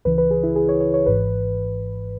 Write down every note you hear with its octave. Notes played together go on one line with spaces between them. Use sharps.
C#2 C#3 E3 B4
B4
G#4
E4
G#4
C#5
C#5
C#5
G#1 G#2 E3 B4